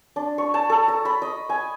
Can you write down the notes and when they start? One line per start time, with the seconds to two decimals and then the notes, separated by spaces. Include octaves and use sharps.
0.16 D4
0.38 C#6
0.54 A5
0.70 A4
0.88 A#5
1.05 B5
1.22 D#5
1.49 G#5